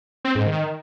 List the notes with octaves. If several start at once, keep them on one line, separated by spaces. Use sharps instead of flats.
C4
G#2
D#3